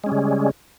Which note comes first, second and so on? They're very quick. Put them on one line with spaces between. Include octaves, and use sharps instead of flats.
G#3 C#4 G3 C#3